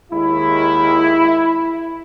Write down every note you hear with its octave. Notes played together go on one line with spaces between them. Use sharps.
D#2 D#3 G#3 E4